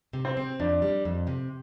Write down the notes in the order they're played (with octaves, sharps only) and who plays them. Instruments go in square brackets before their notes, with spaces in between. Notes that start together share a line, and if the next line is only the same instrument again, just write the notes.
[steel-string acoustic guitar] C3
[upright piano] C4
[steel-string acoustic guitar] C4
[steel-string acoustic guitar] F2 [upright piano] D4
[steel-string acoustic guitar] G3
F2
C3